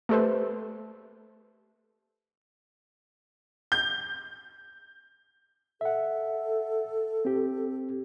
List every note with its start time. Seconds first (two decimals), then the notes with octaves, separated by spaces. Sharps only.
0.09 A3 G4 A4 B4 C5
3.72 G6
5.81 A4 E5 F#5
7.25 C4 G4